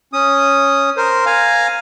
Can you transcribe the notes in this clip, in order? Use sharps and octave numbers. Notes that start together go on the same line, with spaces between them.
C#4 D#6
A#4 C5
F5 G#5 A#5